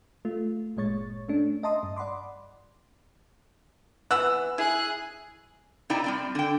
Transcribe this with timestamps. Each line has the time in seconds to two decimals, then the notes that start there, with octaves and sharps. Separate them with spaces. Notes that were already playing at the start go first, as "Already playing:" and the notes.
0.25 A3 F4
0.77 G1 A#2 G#3 C#5 C#6 A6
1.29 A3 C#4 D4
1.63 D#5 E5 A5 A#5 C6 D#6
1.83 G2
1.97 D5 F#5 B5 C6 D6
4.11 E3 B3 F#5 E6
4.58 E4 G#4 F#6
5.90 C3 D#4 E4 D5 G5 A#5
6.04 G3 C4 D5
6.35 D3 G5